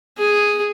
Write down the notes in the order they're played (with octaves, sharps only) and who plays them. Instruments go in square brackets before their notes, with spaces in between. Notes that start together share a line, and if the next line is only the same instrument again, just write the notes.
[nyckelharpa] G#4